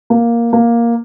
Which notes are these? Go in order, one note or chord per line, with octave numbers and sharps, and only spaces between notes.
A#3
A#3